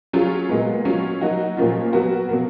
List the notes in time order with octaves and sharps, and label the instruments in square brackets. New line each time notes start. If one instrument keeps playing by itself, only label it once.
[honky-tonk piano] F#3 C#4 F4 G#4
A#2 G#3 B3
F#3 C#4 F4
F#3 A#3 D#4 F#4
A#2 F3 A#3 C#4 F4
F#3 B3 F#4 A#4
B2 F#3 A#3